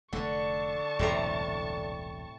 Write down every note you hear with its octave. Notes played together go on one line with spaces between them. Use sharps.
F1 D3 A3 A5 C#6
E1 C2 F#2 A2 C3 A#5